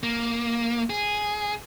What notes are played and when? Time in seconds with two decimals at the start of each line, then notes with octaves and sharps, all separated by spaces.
0.03 A#3
0.90 G#4